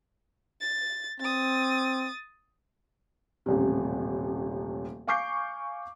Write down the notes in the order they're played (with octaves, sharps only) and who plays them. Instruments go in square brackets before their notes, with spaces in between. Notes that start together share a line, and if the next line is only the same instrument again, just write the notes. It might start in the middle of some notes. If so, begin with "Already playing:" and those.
[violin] A6
[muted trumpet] C4 [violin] D#6 A6
[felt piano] D#1 A1 C3
F5 G#5 C#6 D6 G6 C7